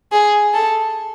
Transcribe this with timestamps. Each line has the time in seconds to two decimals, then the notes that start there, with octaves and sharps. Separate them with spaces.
0.12 G#4
0.54 A4